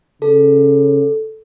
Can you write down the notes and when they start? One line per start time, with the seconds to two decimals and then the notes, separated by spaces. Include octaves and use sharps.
0.22 C#3 A4